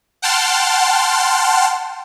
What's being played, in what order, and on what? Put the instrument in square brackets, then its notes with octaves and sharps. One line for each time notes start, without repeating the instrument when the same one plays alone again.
[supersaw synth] F#5 G5 A5 C6 F6